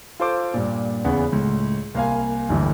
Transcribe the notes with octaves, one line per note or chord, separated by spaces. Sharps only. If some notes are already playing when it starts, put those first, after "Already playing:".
F4 A4 C5 C6 D6
G2 A#2
E2 C#3 B3
C#2 A2
C2 A#3 F5 G#5
D1 G1 G2 E3